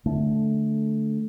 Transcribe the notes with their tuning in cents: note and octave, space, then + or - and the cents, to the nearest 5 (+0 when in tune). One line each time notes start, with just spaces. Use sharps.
D3 +0 A3 -10